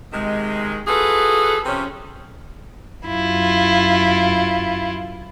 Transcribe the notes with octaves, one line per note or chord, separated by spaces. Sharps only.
C3 D#3 G#3
F4 F#4 G#4 A4 B4
C3 F3 C4 C#4
F#2 E4 F4